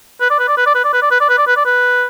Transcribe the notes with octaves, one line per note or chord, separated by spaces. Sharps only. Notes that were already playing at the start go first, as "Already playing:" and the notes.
B4
D5
B4
D5
B4
D5
B4
D5
B4
D5
B4
D5
B4
D5
B4
D5
B4